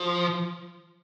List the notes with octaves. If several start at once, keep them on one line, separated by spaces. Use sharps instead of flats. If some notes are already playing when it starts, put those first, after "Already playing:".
Already playing: F3